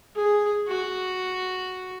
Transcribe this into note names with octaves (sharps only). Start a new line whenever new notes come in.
G#4
F#4